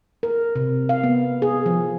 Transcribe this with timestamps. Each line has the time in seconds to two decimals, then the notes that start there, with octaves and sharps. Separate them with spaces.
0.23 A#4
0.55 C3
0.89 F5
1.03 B3
1.42 G#4
1.66 F3